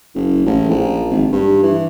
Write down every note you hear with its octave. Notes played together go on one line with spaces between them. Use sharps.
F#1
A1
A#1
G#1
G2
E3